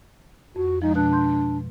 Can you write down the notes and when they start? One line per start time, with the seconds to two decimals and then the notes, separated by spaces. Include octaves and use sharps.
0.56 F2 F#4
0.82 F3 G#3 D#4
0.95 B2 D4 F#6
1.13 C6 G6